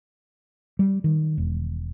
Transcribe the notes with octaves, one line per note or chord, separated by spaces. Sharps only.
G3
D#3
E1